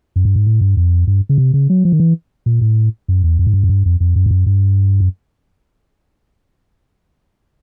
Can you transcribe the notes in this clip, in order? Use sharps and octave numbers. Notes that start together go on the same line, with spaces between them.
F#2
G2
G#2
A2
G2
F2
G2
C#3
C3
C#3
F#3
F3
D#3
E3
A#2
A2
F#2
E2
F2
G#2
G2
F#2
G2
F2
F2
F#2
G2
F#2
G2
F#2